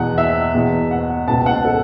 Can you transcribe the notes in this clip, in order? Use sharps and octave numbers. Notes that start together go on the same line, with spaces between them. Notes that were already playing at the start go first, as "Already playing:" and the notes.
Already playing: E2 B2 F#5
E5
E2 B2
F#5
C#2 B2 A5
F#5
A4